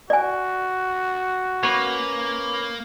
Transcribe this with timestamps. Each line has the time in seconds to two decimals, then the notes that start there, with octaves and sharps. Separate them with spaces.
0.10 F#4 D5 G#5
1.63 A#3 C#4 B4 C#5